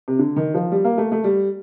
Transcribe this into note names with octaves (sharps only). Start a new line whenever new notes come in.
C3
D3
D#3
F3
G3
A#3
A3
A3
G3